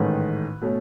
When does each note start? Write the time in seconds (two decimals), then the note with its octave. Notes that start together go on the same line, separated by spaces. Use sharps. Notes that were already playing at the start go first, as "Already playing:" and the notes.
Already playing: A1 G#2 D#3 A3 C#4 B4
0.61 B2 A3 C#4